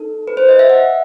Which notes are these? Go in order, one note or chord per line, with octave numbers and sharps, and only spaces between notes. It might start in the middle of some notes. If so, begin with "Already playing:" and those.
Already playing: D#4 A4
B4
C5
D#5
E5
F#5